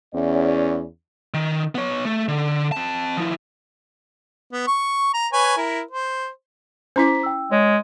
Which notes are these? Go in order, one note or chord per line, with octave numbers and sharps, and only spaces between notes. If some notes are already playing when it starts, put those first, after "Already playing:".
E2 C#4 D5
D#3
B3 C#5
A3
D3
C4 A5
F3 E4
B3
C#6
A#5
B4 C#5 G#5
E4 A#4
C5
C#4 E4 C5 A#5 D6 B6
G5 E6
G#3 C#5